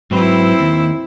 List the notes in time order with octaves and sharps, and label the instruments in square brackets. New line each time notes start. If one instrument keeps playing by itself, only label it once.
[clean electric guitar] G#2 F#3 B4 [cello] C4 E4
[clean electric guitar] D#2